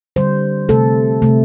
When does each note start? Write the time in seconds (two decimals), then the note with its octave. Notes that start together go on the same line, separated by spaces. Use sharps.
0.16 D3 G3 C5
0.69 C3 A3 A4
1.22 C3 A3